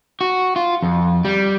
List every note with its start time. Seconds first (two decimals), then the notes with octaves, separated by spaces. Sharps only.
0.21 F#4
0.56 F4
0.82 F2
1.25 G3